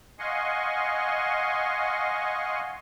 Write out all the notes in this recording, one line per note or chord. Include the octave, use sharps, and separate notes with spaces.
D#5 F5 F#5 G#5 C6 C#6